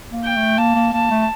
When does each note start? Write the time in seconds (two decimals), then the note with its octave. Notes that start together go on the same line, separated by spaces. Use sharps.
0.12 A#3
0.24 G5
0.36 A3
0.58 A#3 A5
0.75 A#3
0.93 A#3 A5
1.11 A3